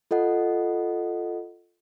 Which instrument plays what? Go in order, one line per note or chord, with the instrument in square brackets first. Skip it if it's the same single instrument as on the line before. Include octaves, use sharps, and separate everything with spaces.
[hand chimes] F4 A4 D#5 F#5